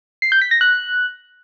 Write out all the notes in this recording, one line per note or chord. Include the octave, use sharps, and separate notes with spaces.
C7
G6
B6
A#6
F#6